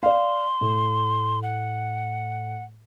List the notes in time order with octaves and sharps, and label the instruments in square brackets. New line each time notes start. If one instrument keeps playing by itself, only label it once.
[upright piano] D5 F5 [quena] C6
[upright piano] A2
[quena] F#5